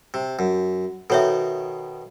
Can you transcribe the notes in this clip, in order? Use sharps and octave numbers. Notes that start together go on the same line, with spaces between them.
C3
F#2
B2 D#3 A4 C#5 E5